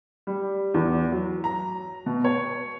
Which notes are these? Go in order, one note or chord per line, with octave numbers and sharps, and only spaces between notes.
G3
E2
F#3
A#5
B2
C#5